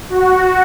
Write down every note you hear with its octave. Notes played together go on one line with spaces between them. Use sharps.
F#4